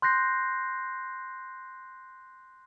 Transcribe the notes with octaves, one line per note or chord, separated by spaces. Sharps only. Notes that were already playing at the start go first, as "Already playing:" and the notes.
C6 F#6 G6 A#6 C7